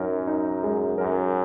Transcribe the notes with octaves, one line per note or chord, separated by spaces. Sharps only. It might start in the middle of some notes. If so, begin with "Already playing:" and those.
Already playing: F#2 D#4 A#4
D#4
G#3
F#2 A#4